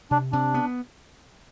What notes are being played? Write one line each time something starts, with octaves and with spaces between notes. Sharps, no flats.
C3 D4
C3 D4
B3